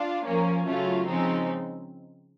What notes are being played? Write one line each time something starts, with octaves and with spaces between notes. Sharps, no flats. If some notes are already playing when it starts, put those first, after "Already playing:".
Already playing: D4 F4
F3 A#3 C#4
C#3 F#3 A3 C#4 F4
C#3 F3 G#3 C4 D#4